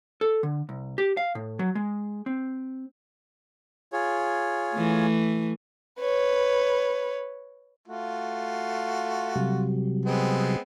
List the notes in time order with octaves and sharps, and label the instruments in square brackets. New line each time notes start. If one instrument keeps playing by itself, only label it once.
[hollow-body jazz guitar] A4
D3
C2
G4
F5
A2
F#3
G#3
C4
[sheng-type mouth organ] F4 G#4 C#5
[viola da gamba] E3 A3
[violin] B4 C#5
[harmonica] A3 F4 F#4
[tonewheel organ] C3 F#3 G3
[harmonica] G#3 B3 C4